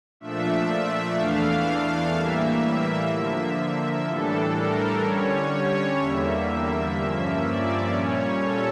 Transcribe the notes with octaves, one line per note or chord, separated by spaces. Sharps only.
A#2 F3 A3 D4 E5
E2 E3 A3 D4 F5
A2 E3 G3 A#3 E5
D3 F3 A#3 E5
A2 E3 G3 D4 A4
A#4
D3 G3 C#4 C#5
E2 D3 G3 A#3 E5
E5
G2 F3 A#3 C#4
D5
A#2 G3 C#4 C#5
A4